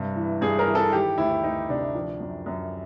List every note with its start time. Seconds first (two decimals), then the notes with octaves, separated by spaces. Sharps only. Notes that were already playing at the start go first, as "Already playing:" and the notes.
Already playing: G2 C3
0.16 E3
0.41 G2 G#4
0.59 A#4
0.67 E3
0.75 A4
0.92 D#3 G4
1.18 D2 E4
1.43 D2 D#4
1.69 C3 D4
1.95 F3
2.20 F#2
2.46 F#2